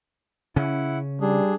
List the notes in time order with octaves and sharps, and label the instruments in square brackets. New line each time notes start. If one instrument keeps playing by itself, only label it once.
[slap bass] C#3 C#4 [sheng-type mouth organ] E4 F#5
[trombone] G3 [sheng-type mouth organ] D4 G#4